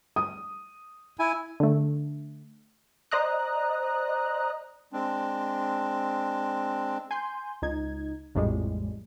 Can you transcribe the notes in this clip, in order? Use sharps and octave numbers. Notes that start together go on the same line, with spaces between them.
D#6
E4 G#5
D3 A3
C5 D5 D#5 A#5 D#6 F#6
G#3 C4 D4
G#5 C6 G6
C#2 D#4 G#6
A#1 F2 A2 G3 G#3